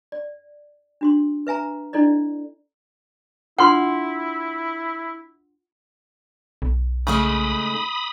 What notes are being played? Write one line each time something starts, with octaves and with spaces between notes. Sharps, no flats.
D5
D4 F#4 C6
B4 E5 G#5 A#5
D4 E4 A4 D5 D#5
D4 E4 F4 F#5 C6
B1
C#3 G#3 A3 D#4 B5 D#6